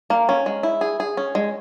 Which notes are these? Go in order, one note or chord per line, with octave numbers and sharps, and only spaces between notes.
A#3
C#4
G#3
E4
G#4
G#4
C#4
G#3